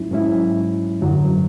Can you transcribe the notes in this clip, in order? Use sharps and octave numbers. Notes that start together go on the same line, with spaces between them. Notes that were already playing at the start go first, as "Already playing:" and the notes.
Already playing: G#2 F#3 C#4 E4
G#2 F#3 C#4 E4
F#2 D3 F#3